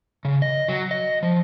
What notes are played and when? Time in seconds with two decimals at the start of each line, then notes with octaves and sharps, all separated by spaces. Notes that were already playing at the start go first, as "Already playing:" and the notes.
0.25 C#3
0.42 D#5
0.68 F#3
0.91 D#5
1.23 F3